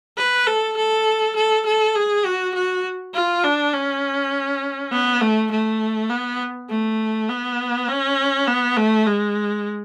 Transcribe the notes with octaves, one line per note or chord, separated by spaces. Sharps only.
B4
A4
A4
A4
A4
G#4
F#4
F#4
F4
D4
C#4
B3
A3
A3
B3
A3
B3
C#4
B3
A3
G#3